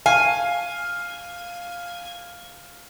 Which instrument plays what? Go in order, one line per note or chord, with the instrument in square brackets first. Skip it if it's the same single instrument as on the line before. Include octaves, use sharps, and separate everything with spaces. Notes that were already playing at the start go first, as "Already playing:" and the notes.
[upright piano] F5 [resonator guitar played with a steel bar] G#5